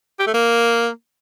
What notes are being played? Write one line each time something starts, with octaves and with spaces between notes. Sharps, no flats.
G4
A3
A#3